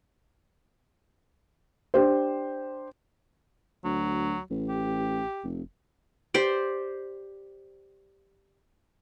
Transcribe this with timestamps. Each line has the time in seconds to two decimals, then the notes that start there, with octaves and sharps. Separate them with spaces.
1.94 D4 G4 C5
3.85 D2 F#3
4.51 A1
4.69 G4
5.44 F1
6.34 G4 C5 D5